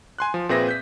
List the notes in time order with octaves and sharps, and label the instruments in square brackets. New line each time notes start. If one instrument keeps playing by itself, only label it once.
[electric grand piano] G#5 C6 F#6
F3
A#2 C4 G#4 B4 E5 A#6
G6 B6